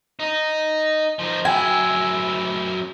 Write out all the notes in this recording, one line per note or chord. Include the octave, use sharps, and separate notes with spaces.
D#4
F3 D#4
F#2 E4 G#5